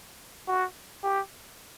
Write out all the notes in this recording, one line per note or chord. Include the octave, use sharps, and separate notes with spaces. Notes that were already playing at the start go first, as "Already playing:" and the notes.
F#4
G4